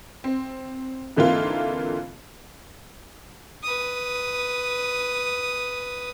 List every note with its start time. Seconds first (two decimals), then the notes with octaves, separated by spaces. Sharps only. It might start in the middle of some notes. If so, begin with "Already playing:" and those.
0.24 C4
1.17 G#2 D3 E3 A#3 C4 F4
3.63 B4 D#6